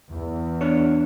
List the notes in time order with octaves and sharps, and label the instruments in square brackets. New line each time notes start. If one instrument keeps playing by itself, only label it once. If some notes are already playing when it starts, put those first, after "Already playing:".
[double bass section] E2
[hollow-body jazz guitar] B3 D4 C#5